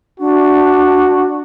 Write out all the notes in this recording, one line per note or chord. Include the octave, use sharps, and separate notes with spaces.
D4 F#4